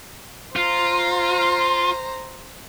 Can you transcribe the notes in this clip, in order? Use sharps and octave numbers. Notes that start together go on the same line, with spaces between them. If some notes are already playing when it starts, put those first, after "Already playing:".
F4 C5 A#5